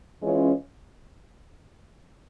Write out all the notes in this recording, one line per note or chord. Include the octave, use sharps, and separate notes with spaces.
E3 G#3 C#4 F4